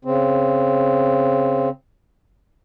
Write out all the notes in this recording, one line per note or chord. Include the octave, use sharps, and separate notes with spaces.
C#3 C4